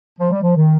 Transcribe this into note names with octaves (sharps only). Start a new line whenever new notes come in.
F3
G3
F3
D#3